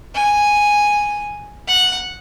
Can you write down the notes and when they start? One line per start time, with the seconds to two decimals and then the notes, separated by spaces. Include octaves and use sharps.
0.15 G#5
1.68 F#5